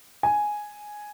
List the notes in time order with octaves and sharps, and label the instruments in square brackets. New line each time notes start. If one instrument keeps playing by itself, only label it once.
[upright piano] G#5